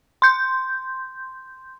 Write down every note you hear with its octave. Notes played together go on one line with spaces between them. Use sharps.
C6 G6